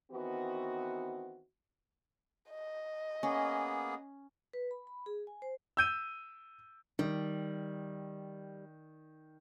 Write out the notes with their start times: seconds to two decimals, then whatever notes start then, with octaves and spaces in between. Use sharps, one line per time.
0.11 D#3 E3 B3 C4 F#4
2.50 D#5
3.23 A#3 B3 C#4 G#4
4.53 B4
4.71 B5
4.87 B5
5.06 G#4
5.27 G#5
5.42 C5
5.77 E6 G6 D#7
6.99 D#3 G3